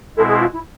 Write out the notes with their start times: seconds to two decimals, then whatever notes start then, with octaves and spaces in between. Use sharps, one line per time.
0.17 B2 G#3 C4 E4 A4
0.28 G#4
0.40 F4
0.53 E4